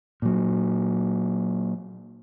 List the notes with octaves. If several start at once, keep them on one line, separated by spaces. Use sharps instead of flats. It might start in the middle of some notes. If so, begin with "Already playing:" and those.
A#2 F#3